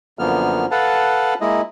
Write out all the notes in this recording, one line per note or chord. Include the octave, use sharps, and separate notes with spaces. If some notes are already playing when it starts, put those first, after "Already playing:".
F#2 D3 F3 A#3 B3 F6
A4 B4 F5 F#5 A5
G#3 A#3 E4 D#5